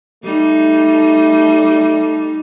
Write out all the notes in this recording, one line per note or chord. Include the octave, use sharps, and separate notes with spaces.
G3 A3 D#4